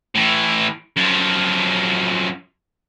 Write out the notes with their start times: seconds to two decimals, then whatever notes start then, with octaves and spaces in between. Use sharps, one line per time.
0.15 A2 E3
0.96 F#2 F3